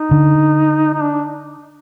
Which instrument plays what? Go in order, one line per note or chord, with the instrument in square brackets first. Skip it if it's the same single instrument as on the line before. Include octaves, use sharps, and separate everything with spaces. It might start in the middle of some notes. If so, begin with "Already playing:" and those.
Already playing: [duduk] D#4
[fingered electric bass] D3
[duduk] D#4
D4